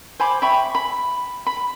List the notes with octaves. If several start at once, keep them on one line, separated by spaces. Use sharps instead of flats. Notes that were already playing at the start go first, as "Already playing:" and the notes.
C5 G#5 B5 D6
E5 G5 B5 C#6
B5
B5